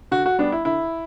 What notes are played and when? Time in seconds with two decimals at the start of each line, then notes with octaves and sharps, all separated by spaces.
0.11 D3 F#4
0.26 F#4
0.38 G3 B3 D4
0.52 E4
0.65 D3 E4